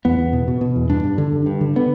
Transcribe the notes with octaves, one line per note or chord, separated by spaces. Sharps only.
E2 B3
E2
B2
B2
B2
E2
G2 D4
G2
D3
G2
G2
D3
D3 B3